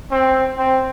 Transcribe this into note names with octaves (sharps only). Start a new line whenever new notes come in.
C4
C4